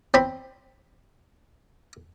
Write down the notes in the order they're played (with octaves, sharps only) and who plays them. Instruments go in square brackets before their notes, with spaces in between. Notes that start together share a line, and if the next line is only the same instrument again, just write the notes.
[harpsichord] C4 C5 B5